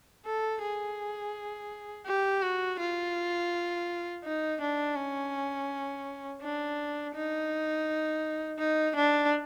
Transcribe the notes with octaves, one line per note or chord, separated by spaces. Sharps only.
A4
G#4
G4
F#4
F4
D#4
D4
C#4
D4
D#4
D#4
D4